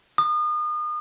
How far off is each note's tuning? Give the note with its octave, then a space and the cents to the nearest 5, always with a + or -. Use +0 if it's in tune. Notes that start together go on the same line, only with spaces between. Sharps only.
D#6 -35